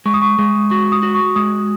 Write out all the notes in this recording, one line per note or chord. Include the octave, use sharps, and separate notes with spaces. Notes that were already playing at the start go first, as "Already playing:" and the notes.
G#3 C#6
D#6
C#6
G#3
F#4 C#6
D#6
F#4
C#6
G#3 D#6